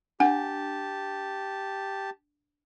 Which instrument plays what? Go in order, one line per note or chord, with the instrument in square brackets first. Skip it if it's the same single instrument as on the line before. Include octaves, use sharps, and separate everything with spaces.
[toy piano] D4 [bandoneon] G4 A5 [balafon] F#5